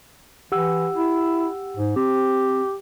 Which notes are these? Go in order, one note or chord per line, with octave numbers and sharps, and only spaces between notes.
E3 G4 F#5 E6
E4
G#2
C4 G4